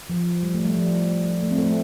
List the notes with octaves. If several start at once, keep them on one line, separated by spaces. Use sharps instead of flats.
F3
G3
A3
G3
F3
A3
C4
A3
C4